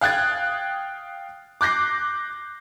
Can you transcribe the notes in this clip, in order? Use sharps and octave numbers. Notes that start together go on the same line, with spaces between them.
F5 G5 D#6 F#6 G#6 A6
D6 F#6 G6 A#6 C7